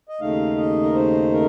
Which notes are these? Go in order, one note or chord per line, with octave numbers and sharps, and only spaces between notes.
D#5
D#2 C#3 A3 D#4 F5
D#5
A#4
C5
A#4